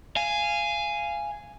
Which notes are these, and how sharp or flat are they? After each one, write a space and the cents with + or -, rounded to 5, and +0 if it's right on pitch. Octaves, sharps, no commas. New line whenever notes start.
F5 -20 G#5 +0